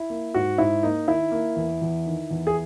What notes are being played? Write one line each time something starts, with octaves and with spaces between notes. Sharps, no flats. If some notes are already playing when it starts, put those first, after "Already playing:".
Already playing: E4
A#3
G#2 F#4
G#2 E4
A#3 D#4
D#3 E4
A#3
E2
E2
D#3
E2
G#4